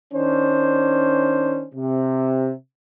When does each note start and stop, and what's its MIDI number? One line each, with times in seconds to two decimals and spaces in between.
0.14 1.65 51
0.14 1.65 61
0.14 1.65 62
0.14 1.65 72
1.75 2.50 48